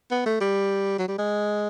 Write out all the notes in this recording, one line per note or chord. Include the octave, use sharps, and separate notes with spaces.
B3
A3
G3
F#3
G3
G#3